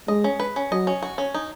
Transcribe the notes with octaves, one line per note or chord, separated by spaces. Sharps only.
G#3 D#5
C#4
B4
C#4
F#3 D#5
C#4
F#4
C#4
D#4